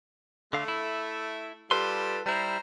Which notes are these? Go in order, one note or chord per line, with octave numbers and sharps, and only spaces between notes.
D3 A3 F5
E4
G3 F4 A4 B4 A5 C6
G3 E4 C5 A#5